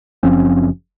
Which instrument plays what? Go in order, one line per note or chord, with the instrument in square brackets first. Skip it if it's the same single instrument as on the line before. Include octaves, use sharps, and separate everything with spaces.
[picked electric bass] F#1 F3 C4 C#4